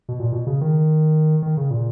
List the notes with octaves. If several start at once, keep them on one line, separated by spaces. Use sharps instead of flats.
B2
A#2
B2
C#3
D#3
D#3
C#3
A#2